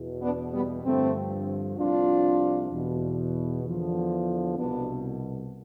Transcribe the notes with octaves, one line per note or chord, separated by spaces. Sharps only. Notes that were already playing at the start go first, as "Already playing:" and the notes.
Already playing: E2 B2
B3 D4
G3 B3
G2 D3 F3 A3 C4
C2 C3 F3 D4 F4
E2 B2
E2 D3 F3
C2 B2 B3 D4